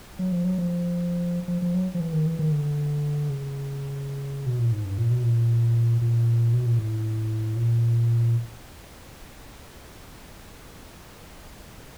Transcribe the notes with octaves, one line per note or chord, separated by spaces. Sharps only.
F#3
F3
F#3
F3
F3
F3
F#3
F3
E3
D#3
E3
D#3
D3
C#3
B2
A#2
G#2
G2
A#2
B2
A#2
A#2
B2
A#2
A2
A#2